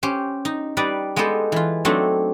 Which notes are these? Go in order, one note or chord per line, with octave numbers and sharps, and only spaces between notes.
C#4 G4 C5
D#4
G3 D#4 B4 D5
G#3 B3 G4 A4 C5
E3 F4
F#3 A3 C4 D4 D#4